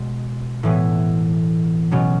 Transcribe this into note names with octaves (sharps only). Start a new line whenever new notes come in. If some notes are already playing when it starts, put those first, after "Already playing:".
Already playing: B2 G#3
A2 E3 B3
B2 F#3 C#4